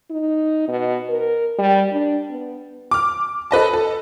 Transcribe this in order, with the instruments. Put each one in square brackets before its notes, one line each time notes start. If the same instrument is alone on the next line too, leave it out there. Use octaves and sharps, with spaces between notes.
[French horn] D#4
B2
A#4
G3
D4
B3
[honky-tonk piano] D6 F6
A4 B4 D#5 A5
A4